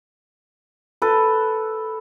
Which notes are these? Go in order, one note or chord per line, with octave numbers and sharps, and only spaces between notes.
A4 B4